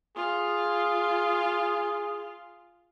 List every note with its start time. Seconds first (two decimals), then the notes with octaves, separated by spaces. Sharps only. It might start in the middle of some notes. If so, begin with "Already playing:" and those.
0.16 F4 G#4